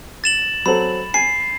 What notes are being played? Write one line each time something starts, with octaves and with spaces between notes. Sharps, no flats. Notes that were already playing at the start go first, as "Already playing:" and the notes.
A6 E7 F#7
F#3 C4 A4 B5
G#5 C7